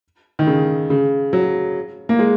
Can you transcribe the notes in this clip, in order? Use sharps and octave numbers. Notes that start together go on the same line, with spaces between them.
D#3
C#3
C#3
F#3
A#3
G#3